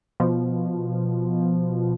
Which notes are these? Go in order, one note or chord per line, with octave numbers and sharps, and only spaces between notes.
B2 F3